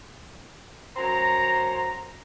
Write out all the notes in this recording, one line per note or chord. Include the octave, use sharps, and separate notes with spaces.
F#2 C5 A#5